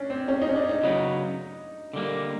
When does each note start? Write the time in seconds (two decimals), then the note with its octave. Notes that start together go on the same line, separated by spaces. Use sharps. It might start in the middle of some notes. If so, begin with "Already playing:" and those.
Already playing: C#4 D4
0.10 C4
0.28 C#4
0.42 D#4
0.49 C#4
0.56 D4
0.69 D#4
0.83 C#3 F#3 B3 D#4
1.93 D3 G3 A#3